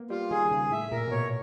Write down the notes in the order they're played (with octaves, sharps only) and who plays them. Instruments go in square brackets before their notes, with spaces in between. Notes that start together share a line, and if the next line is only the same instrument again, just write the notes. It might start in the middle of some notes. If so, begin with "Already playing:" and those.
Already playing: [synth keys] A#3 B3
[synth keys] G3 [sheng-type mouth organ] F4
[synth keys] D#3 [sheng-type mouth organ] G#4
[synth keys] C#3 [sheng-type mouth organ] G#4
[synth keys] A2 [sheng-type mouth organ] E5
[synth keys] A#2 [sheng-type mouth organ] A#4
[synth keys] B2
[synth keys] A#2 [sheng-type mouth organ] C#5